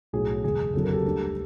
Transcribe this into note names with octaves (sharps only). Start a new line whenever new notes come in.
B1 A2 F#3 G#4
F#1 E2 B2 G#3 G#4
F#1 F2 D3 F#3 A4
A#4
G4 A4
D2 D3 G3